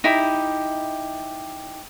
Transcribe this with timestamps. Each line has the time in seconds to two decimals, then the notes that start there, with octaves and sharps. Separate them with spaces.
0.04 D#4 E4 G4